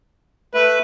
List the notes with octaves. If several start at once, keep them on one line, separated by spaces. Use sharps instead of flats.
A3 B4 E5